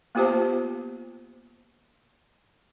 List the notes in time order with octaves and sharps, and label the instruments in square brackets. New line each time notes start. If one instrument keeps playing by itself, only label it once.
[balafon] A#3 B3 F4 G4 C5 A5